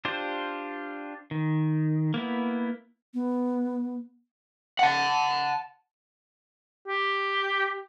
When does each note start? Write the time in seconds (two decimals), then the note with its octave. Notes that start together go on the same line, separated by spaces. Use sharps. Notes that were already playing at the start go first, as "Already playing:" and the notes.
0.05 D4 F4 G4 C5
1.31 D#3
2.14 A#3 B3 E4
3.14 B3
4.79 F#5 A5
6.88 G4